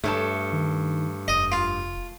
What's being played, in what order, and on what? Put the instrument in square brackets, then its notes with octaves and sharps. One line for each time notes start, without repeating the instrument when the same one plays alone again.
[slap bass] G2 [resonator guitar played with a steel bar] A3 C#5 A5
[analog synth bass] D#3
[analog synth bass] F1 [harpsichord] D#5
[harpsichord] F4